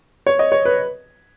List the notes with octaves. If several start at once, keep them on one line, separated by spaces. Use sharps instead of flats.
C#5
D#5
C#5
B4